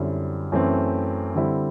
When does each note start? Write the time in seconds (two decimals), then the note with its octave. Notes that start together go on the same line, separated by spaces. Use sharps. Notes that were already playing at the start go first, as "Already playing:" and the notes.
Already playing: F#2 D3 G3 C4 E4
0.52 F#2 E3 A3 C4
1.35 D3 G3 C4 E4